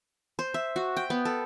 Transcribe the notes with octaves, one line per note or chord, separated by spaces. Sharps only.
C5
E5
F#4
G5
B3
A4